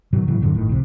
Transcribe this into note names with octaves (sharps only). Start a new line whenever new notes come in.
G#2 B2 D#3 F#3
A2 C#3 E3 F#3
E2 G2 D3 F#3
G1 A2 D#3
C2 F2 C3